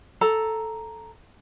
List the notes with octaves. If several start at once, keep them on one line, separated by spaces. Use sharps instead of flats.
A4 A#5